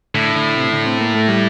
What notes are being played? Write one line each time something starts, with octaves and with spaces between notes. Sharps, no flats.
A2 D3
D3
C3
D3
C4
A#3
A3
G3